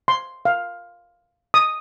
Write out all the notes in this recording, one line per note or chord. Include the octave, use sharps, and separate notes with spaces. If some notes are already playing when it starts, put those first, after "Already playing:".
C6
F5
D#6